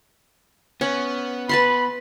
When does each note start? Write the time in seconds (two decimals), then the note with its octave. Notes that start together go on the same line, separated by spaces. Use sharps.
0.81 B3 C#4
1.49 B4 A5 B5 C6